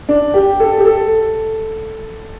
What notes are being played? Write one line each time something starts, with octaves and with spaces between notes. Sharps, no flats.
D4
G4
A4
G4
A4